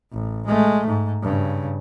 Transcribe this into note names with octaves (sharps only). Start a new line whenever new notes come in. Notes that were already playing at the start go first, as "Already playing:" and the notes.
A1
G#3 A3
G#2
G2 C#3